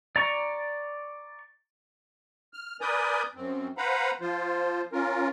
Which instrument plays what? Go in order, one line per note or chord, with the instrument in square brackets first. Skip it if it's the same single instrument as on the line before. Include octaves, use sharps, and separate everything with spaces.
[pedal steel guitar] D5 A#5 C#6
[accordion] F6
A#4 B4 D5 G#5 D#6 G6
F#2 C4
B4 C5 F5 F#5 A#5 B5
F3 F4 C5
C#4 F4 A#4